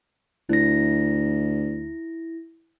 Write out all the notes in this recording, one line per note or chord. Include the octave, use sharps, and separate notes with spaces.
D2 E4 A#6